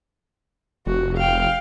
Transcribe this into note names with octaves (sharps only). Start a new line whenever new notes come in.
F1 F#4
F5 G5